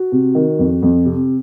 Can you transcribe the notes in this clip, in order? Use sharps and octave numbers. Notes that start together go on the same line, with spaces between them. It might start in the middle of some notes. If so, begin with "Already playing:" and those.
Already playing: F#4
C3
D#3
F2
F2
C3